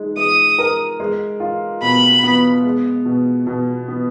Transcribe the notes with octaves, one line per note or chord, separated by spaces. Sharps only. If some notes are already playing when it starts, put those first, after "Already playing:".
Already playing: G#3 D#4
G#3 D#6
A#4
G#3
F4
B2 B5
B3
G#3
B2
B2
B3